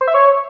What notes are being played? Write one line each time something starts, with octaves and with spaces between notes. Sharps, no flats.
C5
E5
C#5